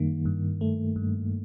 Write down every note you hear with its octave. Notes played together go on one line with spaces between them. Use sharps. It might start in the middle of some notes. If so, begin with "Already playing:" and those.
Already playing: F#2 D#3 G3 A#3
G2
A3
G2